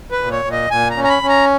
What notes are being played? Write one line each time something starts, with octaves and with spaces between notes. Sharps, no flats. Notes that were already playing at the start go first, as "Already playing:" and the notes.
B4
A#2
C#5
A#2
D#5
A#2 G#5
A#5
C#4
A#5
B5
C#4
A#5